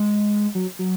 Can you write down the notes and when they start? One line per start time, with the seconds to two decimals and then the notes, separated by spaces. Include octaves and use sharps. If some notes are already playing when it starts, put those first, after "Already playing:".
Already playing: G#3
0.55 F#3
0.79 F#3